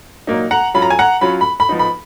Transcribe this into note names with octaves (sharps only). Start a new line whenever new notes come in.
A#2 F#3 A#3 D#4
F#5 A#5
F#3 C#4 F4 B5
A#5
G#5
F#5 A#5
F#3 C#4 F4 B5
B5
B5
F3 B3 D#4
B5